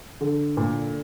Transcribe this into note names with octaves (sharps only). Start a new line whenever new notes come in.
D3
A#2